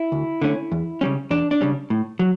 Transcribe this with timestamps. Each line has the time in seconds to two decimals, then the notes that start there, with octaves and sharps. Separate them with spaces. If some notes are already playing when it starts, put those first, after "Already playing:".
Already playing: E4
0.12 D2
0.42 D3 A3 C#4
0.72 E2
1.01 C#3 G3 C#4
1.31 E2 D4
1.51 D4
1.61 C#3 G3 C#4
1.90 A2
2.19 F#3